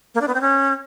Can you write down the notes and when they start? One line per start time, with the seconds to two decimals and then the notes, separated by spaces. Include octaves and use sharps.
0.15 A#3
0.21 D4
0.28 B3
0.34 C4
0.41 C#4